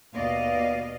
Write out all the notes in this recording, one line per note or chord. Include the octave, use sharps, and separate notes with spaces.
D#2 B2 B3 D5 D#5 F5